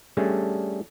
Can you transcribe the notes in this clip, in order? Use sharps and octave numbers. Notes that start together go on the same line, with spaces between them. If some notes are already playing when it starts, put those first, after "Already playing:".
G3 A3 C#4 D4 G#4 A4